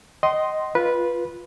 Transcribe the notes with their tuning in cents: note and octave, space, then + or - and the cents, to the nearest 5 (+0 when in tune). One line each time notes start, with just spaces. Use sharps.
D#5 +0 G5 -45 C6 +0
F4 +0 B4 -15